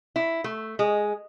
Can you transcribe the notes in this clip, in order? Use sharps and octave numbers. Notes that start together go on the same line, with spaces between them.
E4
A3
G#3